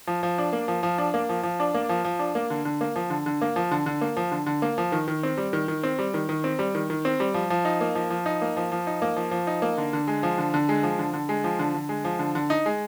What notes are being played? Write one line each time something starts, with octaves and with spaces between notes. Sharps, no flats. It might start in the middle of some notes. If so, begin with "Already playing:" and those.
F3
F3
D4
A#3
F3
F3
D4
A#3
F3
F3
D4
A#3
F3
F3
D4
A#3
D3
D3
A#3
F3
D3
D3
A#3
F3
D3
D3
A#3
F3
D3
D3
A#3
F3
D#3
D#3
C4
G3
D#3
D#3
C4
G3
D#3
D#3
C4
G3
D#3
D#3
C4
G3
F3
F3
D#4
A#3
F3
F3
D#4
A#3
F3
F3
D#4
A#3
F3
F3
D#4
A#3
D3
D3
G#3
F3
D3
D3
G#3
F3
D3
D3
G#3
F3
D3
D3
G#3
F3
D3
D3
D#4
G#3